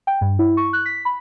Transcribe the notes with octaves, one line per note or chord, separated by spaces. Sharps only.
G5
G2
E4
C#6
F#6
B6
B5